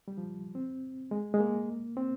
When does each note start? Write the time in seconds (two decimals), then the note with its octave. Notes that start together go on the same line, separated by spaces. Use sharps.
0.08 G3
0.18 F3
0.55 C4
1.11 G#3
1.34 G#3
1.40 A#3
1.97 C4